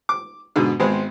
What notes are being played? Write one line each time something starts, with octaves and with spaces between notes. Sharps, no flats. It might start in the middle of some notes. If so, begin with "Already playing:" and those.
D6
G#2 B2 D3
G#1 G#3 B3 C4